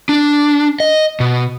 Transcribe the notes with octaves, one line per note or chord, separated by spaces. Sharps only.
D4
D#5
B2